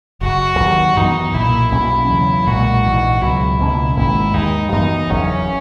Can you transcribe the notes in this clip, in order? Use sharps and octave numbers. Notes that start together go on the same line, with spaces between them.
F#1 F#2 C#3 F#4
D#2 D#3 F#3
F#2 E3 B3 D#4
B1 A#2 A#3 E4
B1 B2 A#3 C#4 E4
E2 C#3 F#3
B1 A#2 G#3 F#4
A#1 G#2 E3
C#2 B2 F#3 E4
C#2 B2 A#3 C#4
G#1 G#2 D#3 A#3 E4
D#2 D#3 G#3 D#4
F#2 E3 G#3 B3 D#4
F#1 E2 C#3 F#3 C#4